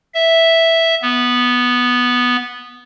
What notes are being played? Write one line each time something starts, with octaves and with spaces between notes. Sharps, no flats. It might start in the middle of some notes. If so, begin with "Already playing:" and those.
E5
B3